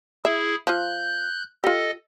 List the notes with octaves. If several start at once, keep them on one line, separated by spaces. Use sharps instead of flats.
E4 G#4 E5
F3 F4 F#6 G6
F4 G4 A4 D#5